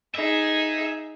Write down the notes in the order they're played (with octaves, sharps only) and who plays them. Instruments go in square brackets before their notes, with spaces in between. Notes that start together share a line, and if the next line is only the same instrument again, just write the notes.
[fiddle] D#4 G#4 [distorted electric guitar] E5